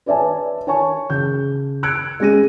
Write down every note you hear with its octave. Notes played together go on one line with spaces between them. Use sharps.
B4 C#5 D5 E5 G#5 A5
C#5 G#5 A5 C#6
C#3 G6
E6 F#6 G#6 C#7 D7
G#3 C#4 A#6 D#7